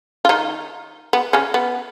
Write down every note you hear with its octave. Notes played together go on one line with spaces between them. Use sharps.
F4
D#3 D#4
B3
C#3 C#4
B3